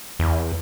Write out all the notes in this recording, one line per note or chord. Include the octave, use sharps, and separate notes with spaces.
E2